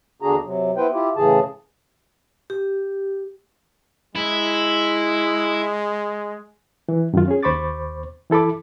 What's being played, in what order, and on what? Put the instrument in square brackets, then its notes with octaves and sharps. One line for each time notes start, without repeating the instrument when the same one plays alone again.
[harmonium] E2 D3 D4 F#4 G#4 A#5
C3 F#3
B3 E4 B4 C5 G5
E4 F4 G4
A2 C#3 E3 G#4 A5
[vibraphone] G4
[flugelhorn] G#3 [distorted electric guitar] E4
[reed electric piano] E3
F#2 D#3 F4
C#4 G#4
D#2 C5 B5 C#6 D6 A6
E3 E4 A4 B5 D6